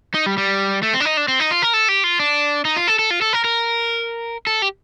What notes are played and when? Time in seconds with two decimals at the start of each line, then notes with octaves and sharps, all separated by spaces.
0.14 D#4
0.26 G3
0.38 G3
0.83 A3
0.94 C4
1.00 D4
1.05 D#4
1.17 D4
1.28 C4
1.40 D#4
1.51 F4
1.62 A#4
1.74 A4
1.89 G4
2.04 F4
2.20 D4
2.65 D#4
2.76 F4
2.87 A4
2.99 A4
3.10 F4
3.21 A4
3.33 A#4
3.44 A#4
4.47 A4
4.62 G4